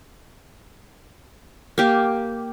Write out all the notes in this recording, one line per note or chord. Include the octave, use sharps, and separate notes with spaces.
A#3 G4